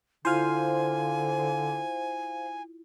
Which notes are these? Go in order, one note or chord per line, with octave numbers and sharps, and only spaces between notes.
D3 E4 F4 C5 F5 G#5 D#7